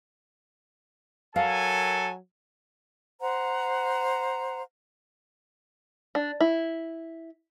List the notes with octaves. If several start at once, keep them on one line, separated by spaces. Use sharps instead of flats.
F#3 A4 A#4 F5 G#5
C5 F#5 A#5
D4
E4